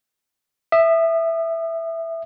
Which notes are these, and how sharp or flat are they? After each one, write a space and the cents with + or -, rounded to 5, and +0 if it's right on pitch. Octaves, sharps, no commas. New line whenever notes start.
E5 +0 D#6 -30